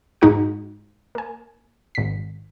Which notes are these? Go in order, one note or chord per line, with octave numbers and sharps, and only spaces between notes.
G#2 G#3 D#4 F#4 F#5
A#3 G#5
G#1 B6